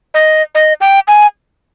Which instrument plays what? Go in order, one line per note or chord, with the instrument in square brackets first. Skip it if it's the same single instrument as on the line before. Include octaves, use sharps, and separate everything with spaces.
[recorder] D#5
D#5
G5
G#5